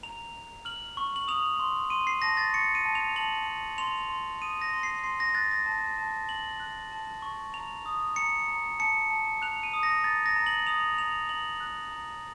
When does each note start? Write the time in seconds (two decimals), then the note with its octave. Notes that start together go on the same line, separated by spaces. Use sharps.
0.03 A#5 F7
0.35 A#5
0.65 F6 F#7
0.97 C#6
1.16 F#7
1.28 D#6 F7
1.60 C6
1.90 C6 D#7
2.07 C7
2.22 A5 A#6
2.37 A6
2.53 C#6 C#7
2.75 D#7
2.85 A5
2.95 F7
3.16 A5 F#7
3.48 A5
3.78 C6 F7
4.10 C6
4.42 D#6 D#7
4.62 A#6
4.73 C6
4.83 C7
5.04 C6 C7
5.20 A#6
5.35 F#6 A6
5.51 A#6
5.66 A5
5.98 A5
6.29 A5 F#7
6.60 F#6
6.92 A5
7.22 C#6
7.54 A#5 F7
7.86 D#6
8.16 A#5 C#7
8.48 A#5
8.79 A5 C#7
9.10 A5
9.42 F#6 F7
9.63 D#7
9.73 D#6
9.83 A#6
10.04 A#5 A6
10.26 A#6
10.36 A#5
10.46 F#7
10.67 D#6 F7
10.98 A#5 F7
11.29 A#5 F#7
11.60 F#6
11.92 A#5